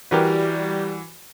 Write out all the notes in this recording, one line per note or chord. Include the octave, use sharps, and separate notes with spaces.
E3 G3 F#4 G4 A#4 B4